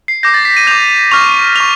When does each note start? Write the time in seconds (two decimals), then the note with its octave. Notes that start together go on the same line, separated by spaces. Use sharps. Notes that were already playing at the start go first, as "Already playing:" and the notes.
0.08 C7
0.23 D6 G6 A#6
0.34 A6
0.45 B6
0.57 D#7
0.67 D6 G6 F7
1.11 C#6 F6 F7
1.56 C#6 F6 F7